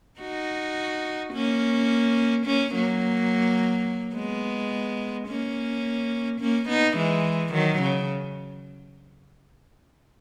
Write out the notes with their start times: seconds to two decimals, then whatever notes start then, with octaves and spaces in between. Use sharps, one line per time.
0.21 D#4 F#4
1.33 A#3 C#4
2.46 A#3 C#4
2.74 F#3 A#3
4.15 G#3 B3
5.28 A#3 C#4
6.41 A#3 C#4
6.69 B3 D#4
6.97 E3 G#3
7.53 D#3 F#3
7.82 C#3